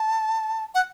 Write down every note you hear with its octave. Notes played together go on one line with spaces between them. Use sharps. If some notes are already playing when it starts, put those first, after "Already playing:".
Already playing: A5
F#5